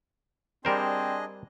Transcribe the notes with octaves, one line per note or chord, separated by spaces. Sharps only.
G3 C4 D4 G#4 A#4 C5 D#5